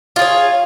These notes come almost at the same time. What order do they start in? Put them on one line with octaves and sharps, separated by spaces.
F4 G#4 C#5